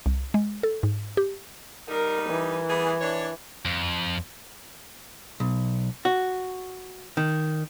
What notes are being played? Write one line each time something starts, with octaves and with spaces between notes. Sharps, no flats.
C2
G#3
A4
G#2
G4
G3 D#4 A#4
E3
G3 B3 G#4
D4 C#5
F2
B1
F#4
D#3